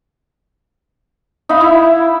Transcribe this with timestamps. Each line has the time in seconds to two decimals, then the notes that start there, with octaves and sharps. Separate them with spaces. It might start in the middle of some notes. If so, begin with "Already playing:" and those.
1.49 D#4 E5 F5 B5
1.61 E4